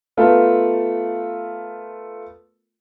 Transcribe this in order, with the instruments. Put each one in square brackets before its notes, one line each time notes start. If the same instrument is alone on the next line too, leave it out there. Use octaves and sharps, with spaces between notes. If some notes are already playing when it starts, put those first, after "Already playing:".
[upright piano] A3 B3 F4 A4 A#4